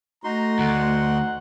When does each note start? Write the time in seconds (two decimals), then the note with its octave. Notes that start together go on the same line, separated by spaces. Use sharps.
0.24 A3 D#4 F#4 A#5 C6
0.60 D2 F#5